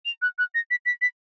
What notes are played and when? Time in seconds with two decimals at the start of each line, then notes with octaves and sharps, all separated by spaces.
0.05 F7
0.22 F#6
0.38 F#6
0.55 A#6
0.71 B6
0.85 B6
1.02 B6